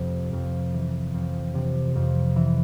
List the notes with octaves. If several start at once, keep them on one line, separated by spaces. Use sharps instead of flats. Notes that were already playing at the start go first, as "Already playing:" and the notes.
Already playing: F2 C3
F2
E3
F2
C3
F2
E3